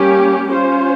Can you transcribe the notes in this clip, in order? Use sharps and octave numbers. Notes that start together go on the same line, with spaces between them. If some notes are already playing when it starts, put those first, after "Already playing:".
Already playing: G3 A#3 C#4 G4
C#4 F4 C5